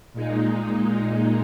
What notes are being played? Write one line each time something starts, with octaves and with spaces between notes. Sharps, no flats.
A#2 G#3 D#4